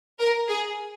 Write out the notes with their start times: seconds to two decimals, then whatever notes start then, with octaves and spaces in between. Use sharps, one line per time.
0.19 A#4
0.48 G#4